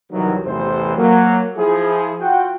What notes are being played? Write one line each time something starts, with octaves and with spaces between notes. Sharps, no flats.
C2 D#3 E3 F#3
A1 E2 C3 E3 A4 C5
F#3 A#3
F3 E4 G#4
F4 F#4 F#5 G5